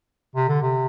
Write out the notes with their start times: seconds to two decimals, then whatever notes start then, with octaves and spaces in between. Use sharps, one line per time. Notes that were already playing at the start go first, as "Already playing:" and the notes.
0.35 C3
0.48 D3
0.62 C3